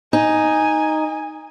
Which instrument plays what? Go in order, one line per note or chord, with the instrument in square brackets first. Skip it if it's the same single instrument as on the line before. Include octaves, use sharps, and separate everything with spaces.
[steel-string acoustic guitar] D#4 [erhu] G#5